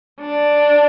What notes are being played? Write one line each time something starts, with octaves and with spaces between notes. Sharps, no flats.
D4